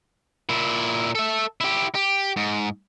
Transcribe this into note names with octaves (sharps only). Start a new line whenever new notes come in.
A#2 E4
A4 E5
E4 G4
G4
G#2